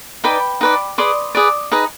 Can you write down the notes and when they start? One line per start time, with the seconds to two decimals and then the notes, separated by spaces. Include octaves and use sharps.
0.24 D#4 B4 D5 G5 B5
0.61 D#4 B4 D5
0.98 G#4 B4 D5 C6 D#6
1.35 G#4 B4 D5
1.72 D#4 G#4 B4 D#5